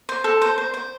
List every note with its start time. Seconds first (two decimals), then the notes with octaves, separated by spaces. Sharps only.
0.09 C5
0.24 A4
0.42 C5
0.58 C5
0.74 C5